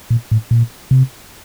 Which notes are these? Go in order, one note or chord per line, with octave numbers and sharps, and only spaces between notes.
A#2
A2
A#2
C3